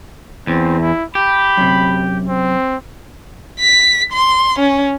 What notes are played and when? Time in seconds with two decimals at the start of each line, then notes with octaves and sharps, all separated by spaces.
0.47 E2 C4
0.80 E4
1.15 G4 B5
1.57 F#2 C3
2.28 C4
3.60 B6
4.13 C6
4.59 C#4